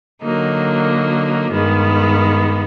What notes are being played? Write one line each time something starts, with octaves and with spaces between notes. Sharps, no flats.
D3 F#3 A#3 D#4
G2 D#3 G#3 B3